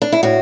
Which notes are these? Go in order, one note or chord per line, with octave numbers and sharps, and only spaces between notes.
D4
E4
A2 F#4